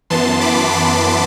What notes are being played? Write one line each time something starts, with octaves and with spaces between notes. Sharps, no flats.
F#2 E3 B3 A5 C6
B5 D6
A5 C6